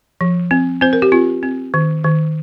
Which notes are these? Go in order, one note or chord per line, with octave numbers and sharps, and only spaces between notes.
F3
C4
C4 C5
A#4
G4
C4 F4
C4
D#3
D#3